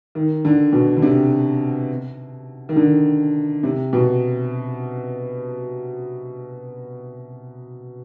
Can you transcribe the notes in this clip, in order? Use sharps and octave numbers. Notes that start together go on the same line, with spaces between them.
D#3
D3
B2
D3
C3
D#3
D3
C3
B2